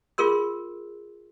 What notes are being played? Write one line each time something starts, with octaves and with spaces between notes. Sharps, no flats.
F4 G#4 A#4 C6 E6